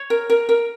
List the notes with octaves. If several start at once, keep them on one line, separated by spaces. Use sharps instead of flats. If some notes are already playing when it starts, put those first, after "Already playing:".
Already playing: C#5
A#4
A#4
A#4